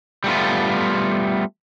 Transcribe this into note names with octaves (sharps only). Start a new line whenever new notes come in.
G3 A3 B3 F4